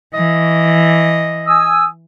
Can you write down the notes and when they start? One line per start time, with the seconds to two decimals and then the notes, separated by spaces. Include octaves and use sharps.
0.14 E3 D#5
1.47 G#5 D#6 E6